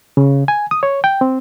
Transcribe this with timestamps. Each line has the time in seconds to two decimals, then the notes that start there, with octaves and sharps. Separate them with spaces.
0.17 C#3
0.48 G#5
0.71 D#6
0.83 C#5
1.04 G5
1.21 C4